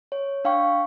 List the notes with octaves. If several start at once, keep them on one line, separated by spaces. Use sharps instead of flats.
C#5
D4 F5 G5 C#6